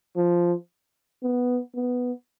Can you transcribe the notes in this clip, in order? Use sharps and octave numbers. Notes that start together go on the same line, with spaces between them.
F3
B3
B3